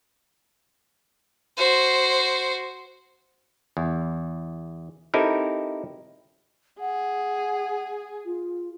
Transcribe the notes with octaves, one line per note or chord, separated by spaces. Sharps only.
F#4 C5
E2
C4 D#4 E4 G4 A4 A#4
G#4 F#5
F4